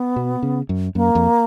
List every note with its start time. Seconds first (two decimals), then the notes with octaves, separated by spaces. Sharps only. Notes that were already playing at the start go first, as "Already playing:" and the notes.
Already playing: B3
0.16 B2
0.43 C#3
0.69 F#2
0.95 F#2 A#3
1.15 F2